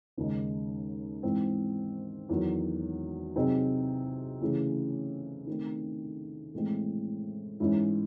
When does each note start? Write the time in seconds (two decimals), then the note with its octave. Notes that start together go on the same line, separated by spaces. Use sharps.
0.17 D#2 C#3 G#3 D#4
1.23 G#2 E3 C4
2.29 E2 D#3 F#3
3.35 C3 F#3 C4 D#4 G#4
4.41 C#3 E3 A3 C#4 G#4
5.47 D#3 A3 C4
6.54 A2 E3 G#3 C4 E4
7.60 G#2 E3 G#3 C#4 E4